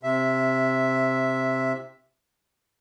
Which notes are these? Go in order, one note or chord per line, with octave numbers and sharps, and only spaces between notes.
C3 E5